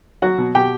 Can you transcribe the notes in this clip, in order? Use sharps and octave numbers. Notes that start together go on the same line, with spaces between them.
F#3 F#4 F#5
B2
B2 G4 G5